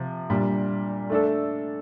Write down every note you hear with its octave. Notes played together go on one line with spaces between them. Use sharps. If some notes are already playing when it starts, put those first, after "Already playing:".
Already playing: C3 F3
A#2 G3 D4
A3 D4 A4